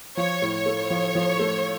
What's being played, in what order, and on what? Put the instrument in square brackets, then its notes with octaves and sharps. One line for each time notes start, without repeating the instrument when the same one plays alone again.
[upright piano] F3 [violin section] C#5
[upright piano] A2
[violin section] C#5
[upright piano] A3
F3
F3
A3